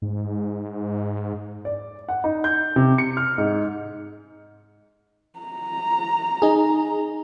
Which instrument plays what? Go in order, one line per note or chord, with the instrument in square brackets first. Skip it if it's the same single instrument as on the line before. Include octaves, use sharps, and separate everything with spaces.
[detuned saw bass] G#2
[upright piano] D5
F#5
D#4
G6
C3
C#7
F6
G#2
[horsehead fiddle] A#5
[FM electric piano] D#4 G#4